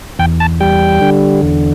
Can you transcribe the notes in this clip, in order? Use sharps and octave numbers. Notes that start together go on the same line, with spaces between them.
E2 G5
A5
G3 G5
D3
E2